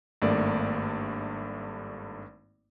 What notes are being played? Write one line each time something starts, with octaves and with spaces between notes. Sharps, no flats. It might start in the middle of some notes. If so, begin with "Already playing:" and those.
G#1 G2 A3 A#3 D5